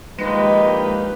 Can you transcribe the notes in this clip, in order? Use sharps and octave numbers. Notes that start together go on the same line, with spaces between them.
A#1 D#2 G#3 D#4 G4 B4